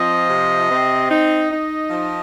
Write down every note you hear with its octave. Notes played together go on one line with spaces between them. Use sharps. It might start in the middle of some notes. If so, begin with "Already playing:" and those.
Already playing: F3 C4 D#5
C3
C4
D#4 D#5
D#4
F3